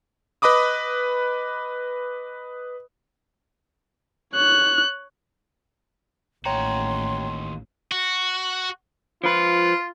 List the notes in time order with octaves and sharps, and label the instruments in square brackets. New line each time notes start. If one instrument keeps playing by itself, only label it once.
[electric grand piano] B4 D#5 B5 D6 D#6
[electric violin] C#5 F#6
[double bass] A1 [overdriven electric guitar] D#2 F#4 [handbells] C#5 G5 A#5 [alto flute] C6
[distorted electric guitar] F#4
[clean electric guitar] F3 B4 [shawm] F4